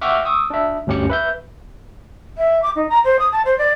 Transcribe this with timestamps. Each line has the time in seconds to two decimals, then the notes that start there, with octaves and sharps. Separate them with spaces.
0.01 E5 F#5 G5 C#6 D6 F6
0.25 C#6 D#6 E6
0.50 D4 E5
0.87 D2 G2 C#4 G4 C#7
1.10 B4 E5 G6
2.38 E5
2.62 D6
2.76 D#4
2.89 A#5
3.04 C5
3.19 D#6
3.32 A5
3.45 C5
3.58 D5